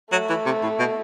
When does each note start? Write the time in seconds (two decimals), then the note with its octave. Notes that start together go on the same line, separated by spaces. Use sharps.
0.12 F#3 A3
0.29 E3
0.46 C3
0.63 A2
0.79 B2